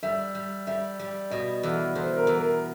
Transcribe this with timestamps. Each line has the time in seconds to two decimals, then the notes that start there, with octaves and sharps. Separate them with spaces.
0.03 G3 E5
0.35 G3
0.67 G3 E5
0.99 G3
1.31 B2 D#5
1.63 E2
1.96 E2 C5
2.17 A#4
2.27 E2
2.38 A#4